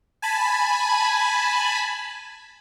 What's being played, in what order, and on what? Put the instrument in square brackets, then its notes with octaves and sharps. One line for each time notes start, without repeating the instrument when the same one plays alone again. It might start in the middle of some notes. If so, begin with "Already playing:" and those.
[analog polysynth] G#5 A5 B5